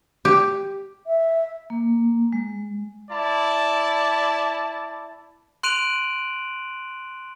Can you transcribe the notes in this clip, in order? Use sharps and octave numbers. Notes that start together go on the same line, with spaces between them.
G4
E5
A#3
G#3
E4 D5 A5
C6 F#6 D7 D#7 F7 F#7